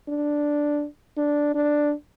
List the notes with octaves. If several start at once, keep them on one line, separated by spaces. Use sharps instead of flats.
D4
D4
D4